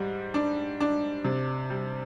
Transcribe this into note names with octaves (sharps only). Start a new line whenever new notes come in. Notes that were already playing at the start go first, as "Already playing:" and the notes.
Already playing: G#2 G3
D4
D4
C3
G3